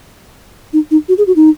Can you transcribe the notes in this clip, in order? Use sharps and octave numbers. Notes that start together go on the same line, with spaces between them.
D#4
D#4
F#4
G#4
F#4
D#4